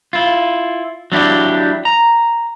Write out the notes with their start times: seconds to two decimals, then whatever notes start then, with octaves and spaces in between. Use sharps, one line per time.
0.13 E4 F4
1.12 F#3 D4 E4 G4
1.85 A#5